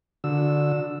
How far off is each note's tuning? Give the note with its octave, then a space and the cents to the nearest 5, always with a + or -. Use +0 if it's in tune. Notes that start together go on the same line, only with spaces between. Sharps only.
D3 +0 F#4 -35 E6 +0